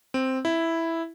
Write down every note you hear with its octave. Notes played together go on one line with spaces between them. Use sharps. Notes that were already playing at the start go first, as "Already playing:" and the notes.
C4
E4